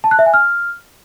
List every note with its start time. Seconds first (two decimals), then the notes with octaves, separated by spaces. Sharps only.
0.04 A5
0.11 F#6
0.19 E5
0.26 G#5
0.34 F6